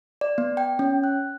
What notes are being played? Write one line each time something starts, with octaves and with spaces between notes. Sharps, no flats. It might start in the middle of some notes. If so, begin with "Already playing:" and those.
D5
B3
G5
C#4
F#6